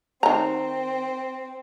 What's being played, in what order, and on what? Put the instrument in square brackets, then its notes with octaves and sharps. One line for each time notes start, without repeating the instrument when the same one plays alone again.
[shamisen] D#3 A#5 [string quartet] C4